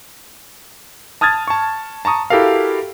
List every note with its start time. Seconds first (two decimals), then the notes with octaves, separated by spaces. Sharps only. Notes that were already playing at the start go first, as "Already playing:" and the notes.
1.21 A5 D#6 F6 G#6 A6
1.47 A5 C#6
2.05 A5 A#5 C#6 D#6
2.30 E4 F#4 G4 A4 A#4 F5